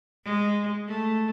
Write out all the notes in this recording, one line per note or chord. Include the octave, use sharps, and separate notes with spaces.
G#3
A3